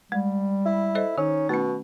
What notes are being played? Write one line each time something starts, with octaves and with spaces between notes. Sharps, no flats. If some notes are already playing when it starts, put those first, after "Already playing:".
G3 G#3
E4
A4 C5 D#5
D#3 C#4 D#4
B2 A3 C#4